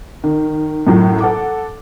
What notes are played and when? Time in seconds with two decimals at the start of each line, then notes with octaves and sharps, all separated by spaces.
0.24 D#3
0.87 F#2 A2 F#3
1.20 A4 F#5 D6